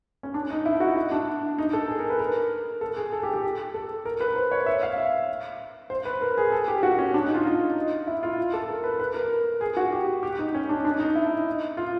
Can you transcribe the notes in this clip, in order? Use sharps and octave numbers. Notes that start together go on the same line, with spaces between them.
C#4
D4
D#4
E4
F#4
E4
D4
D#4
A4
G#4
A#4
B4
A#4
A4
G#4
A4
G4
G4
A4
A#4
B4
C5
C#5
E5
F5
E5
C5
B4
A#4
G#4
A4
G4
F#4
C#4
D4
D#4
F4
D#4
E4
F4
A4
A#4
B4
B4
A#4
G#4
F#4
G4
G4
D#4
C#4
D4
D4
D#4
E4
F4